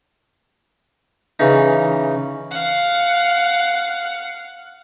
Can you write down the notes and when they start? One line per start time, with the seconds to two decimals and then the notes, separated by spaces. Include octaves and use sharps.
1.40 C#3 E3 D#4
2.51 F5 F#5